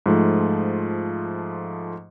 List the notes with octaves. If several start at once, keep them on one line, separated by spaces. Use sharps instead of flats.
G#2 F3 A3